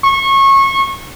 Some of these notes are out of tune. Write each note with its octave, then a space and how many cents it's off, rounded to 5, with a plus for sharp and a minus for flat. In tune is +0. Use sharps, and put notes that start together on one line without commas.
C#6 -25